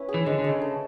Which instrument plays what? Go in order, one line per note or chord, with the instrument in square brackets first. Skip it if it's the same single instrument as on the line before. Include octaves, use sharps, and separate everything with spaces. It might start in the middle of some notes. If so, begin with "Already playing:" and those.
Already playing: [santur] C#4 E4 B4
G#4
[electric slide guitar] E3
[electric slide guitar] D3 [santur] G#3
[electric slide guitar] D3
[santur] G#3
[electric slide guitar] C#3
[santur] A4